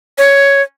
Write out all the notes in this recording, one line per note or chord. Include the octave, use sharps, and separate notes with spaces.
C#5